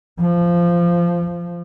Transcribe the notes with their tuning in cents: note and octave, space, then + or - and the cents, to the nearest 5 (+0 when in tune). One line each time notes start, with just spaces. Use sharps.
F3 -15